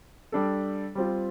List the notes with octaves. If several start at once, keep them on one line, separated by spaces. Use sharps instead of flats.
G3 D4 A4
G3 C4 F4